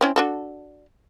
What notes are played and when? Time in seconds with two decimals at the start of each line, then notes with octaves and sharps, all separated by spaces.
0.01 C4 C#4 E4
0.16 D4 F#4 A4